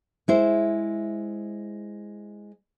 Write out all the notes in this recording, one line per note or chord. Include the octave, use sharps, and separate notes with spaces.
G#3 E4 C5